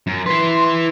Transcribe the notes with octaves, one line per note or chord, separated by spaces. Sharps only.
F#2
E4 B4 C6